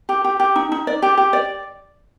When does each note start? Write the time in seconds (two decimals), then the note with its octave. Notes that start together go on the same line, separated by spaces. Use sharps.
0.09 G4
0.24 G4
0.40 G4
0.56 D#4
0.72 D#4
0.87 D5
1.02 G4
1.17 G4
1.33 D5